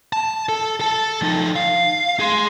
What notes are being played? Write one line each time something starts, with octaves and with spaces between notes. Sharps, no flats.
A5
A4
A4 A5
F3 D#4
F5
G#4 C6